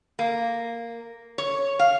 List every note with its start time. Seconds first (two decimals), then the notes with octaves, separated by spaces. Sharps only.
0.19 A#3
1.38 C#5
1.79 F5